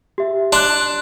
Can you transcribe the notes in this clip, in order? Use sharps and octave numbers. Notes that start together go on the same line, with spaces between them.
G4 E5
D4 C6 F#6